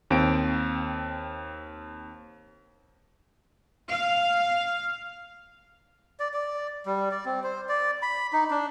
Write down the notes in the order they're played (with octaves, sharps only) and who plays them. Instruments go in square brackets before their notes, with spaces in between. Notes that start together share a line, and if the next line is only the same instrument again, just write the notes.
[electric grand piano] D#2 C4 D7
[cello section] F5
[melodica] D5
D5
G3
D5
C4
C5
D5
B5
D#4
D4